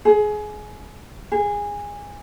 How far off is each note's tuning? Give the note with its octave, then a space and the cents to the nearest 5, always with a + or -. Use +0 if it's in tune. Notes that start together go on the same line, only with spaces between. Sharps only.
G#4 +20
G#4 -20